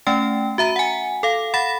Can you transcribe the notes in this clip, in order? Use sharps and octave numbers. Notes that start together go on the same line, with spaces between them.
A3 C#4 G5
F#4 E5 A#5
F#5 G#5
A4 F5
F#5 B5 A6 A#6